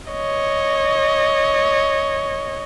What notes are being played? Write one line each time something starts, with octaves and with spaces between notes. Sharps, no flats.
C#5 D#5